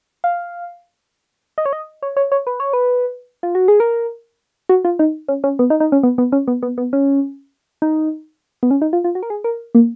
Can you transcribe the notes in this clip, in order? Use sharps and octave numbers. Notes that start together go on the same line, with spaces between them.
F5
D#5
C#5
D#5
C#5
C#5
C#5
B4
C#5
B4
F4
F#4
G#4
A#4
F#4
F4
D#4
C#4
C#4
B3
D#4
D#4
C#4
B3
B3
C#4
B3
B3
B3
C#4
D#4
B3
C#4
D#4
F4
F4
F#4
A#4
G#4
A#4
A#3